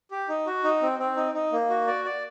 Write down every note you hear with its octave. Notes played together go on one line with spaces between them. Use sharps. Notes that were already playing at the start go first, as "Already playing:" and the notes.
G4
D#4
F#4
D#4
C4
C4
D#4
D#4
A#3
F#4
D5
D5